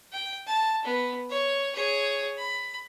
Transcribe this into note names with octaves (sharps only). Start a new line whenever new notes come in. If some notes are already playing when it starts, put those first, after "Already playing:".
G5
A5
B3
C#5
G#4 C#5
B5